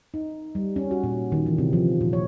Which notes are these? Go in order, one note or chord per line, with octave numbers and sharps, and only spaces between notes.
D#4
G3
C#4
F#4
A#2
D#3
E3
C3
F3
A#2
C#5